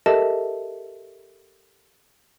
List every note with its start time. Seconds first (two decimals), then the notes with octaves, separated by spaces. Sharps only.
0.06 G4 A4 A#4 D#5 E5 A5